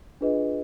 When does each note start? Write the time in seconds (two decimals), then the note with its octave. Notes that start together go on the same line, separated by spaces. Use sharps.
0.21 D4 F4 G#4 B4 D#5